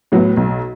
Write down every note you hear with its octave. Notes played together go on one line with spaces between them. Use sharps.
A2 F#3 B3
B1